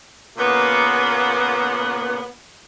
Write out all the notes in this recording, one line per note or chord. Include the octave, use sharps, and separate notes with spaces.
A#2 C#3 A#3 B3